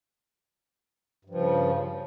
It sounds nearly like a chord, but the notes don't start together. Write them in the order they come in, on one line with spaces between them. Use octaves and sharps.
G2 F3 C#3